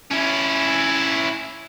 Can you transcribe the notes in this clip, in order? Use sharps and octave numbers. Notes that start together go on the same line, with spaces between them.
C#4 E4